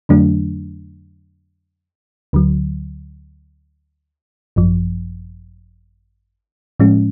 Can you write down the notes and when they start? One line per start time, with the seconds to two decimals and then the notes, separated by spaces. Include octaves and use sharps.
0.09 F2 D3 F#3 A3 D4
2.33 D2 D3 F#3
4.56 G#1 F#2 F3
6.80 A2 F3 G#3 C#4